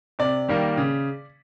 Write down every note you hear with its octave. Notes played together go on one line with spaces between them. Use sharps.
C3 D5
D#3 G3 A#3
C#3